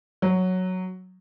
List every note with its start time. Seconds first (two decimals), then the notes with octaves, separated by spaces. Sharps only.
0.22 F#3